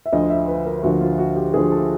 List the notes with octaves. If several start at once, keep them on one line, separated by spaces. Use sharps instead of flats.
E5
D2 D3 F3 D#5
E5
B4
A#4
D2 D3 F3 F#4
F4
F#4
G4
D2 D3 F3 G#4
A4